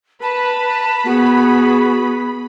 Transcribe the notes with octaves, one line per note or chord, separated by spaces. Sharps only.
B4 A5 B5
B3 F#4 G#4